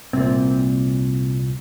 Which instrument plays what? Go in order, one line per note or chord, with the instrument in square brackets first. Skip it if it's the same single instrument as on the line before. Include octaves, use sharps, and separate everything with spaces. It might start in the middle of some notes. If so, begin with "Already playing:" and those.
[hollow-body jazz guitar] C2 A#2 C4